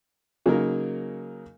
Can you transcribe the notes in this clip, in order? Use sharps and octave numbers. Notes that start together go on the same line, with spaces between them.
C#3 F#3 A#3 D#4 A#4